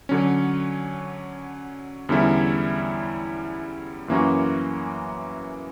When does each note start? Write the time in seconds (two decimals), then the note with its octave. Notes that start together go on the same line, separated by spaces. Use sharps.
0.09 D3 F#3 C#4
2.09 E2 D3 G3 C#4 E4
4.08 F#2 E3 A#3 C#4 F#4